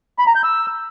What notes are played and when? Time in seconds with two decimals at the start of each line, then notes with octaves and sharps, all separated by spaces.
0.19 B5
0.27 A#5
0.35 G6
0.44 E6